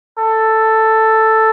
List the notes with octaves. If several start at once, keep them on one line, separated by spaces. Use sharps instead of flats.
A4